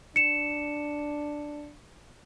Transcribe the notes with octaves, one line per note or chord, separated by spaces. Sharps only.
D4 C#7 E7